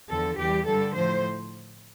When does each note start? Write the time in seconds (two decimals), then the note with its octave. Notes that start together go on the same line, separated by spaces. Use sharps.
0.10 E2 D3 F3 A4
0.38 E2 E3 G3 G4
0.67 G2 D3 G3 A4
0.95 A2 F3 C5